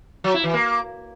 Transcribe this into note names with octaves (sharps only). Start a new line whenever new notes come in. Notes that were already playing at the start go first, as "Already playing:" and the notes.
F#3
E4
E3
A#3